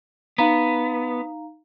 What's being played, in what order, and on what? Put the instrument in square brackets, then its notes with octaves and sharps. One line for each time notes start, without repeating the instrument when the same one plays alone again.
[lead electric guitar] B3 [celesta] D#4 F5 A#5